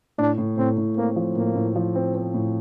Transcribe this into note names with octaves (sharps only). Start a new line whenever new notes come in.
A2 D4
A2
A2 C4
A2
A#3 C4
F3
A2 A#3
A2
F3
C4
C4
A2